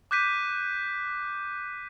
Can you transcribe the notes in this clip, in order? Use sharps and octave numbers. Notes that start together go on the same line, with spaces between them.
D6 F#6 G6 B6 D#7